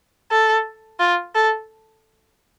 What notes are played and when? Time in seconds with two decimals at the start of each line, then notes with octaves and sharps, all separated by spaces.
0.32 A4
1.00 F4
1.35 A4